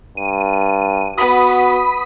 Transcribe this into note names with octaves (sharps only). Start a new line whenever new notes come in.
G2 D#7
B3 F#4 B5 D#6